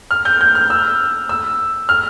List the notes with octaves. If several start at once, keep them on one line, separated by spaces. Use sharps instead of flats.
F6
G6
G6
F6
E6
E6
F6